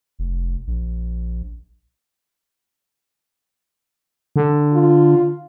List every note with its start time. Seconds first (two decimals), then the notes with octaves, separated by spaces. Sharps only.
0.19 F1
0.67 A#1
4.36 D3
4.74 F4